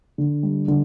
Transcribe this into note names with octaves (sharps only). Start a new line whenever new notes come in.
D3
G3
D3